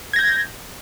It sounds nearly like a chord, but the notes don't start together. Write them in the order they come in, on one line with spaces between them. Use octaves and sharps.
G#6 A#6 G6